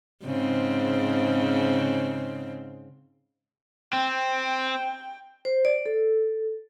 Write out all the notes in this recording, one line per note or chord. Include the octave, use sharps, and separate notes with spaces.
G#2 C#3 C4
C4 G5
C5
D5
A4